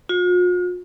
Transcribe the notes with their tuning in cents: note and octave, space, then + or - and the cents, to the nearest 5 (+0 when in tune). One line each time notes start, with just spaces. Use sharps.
F4 +45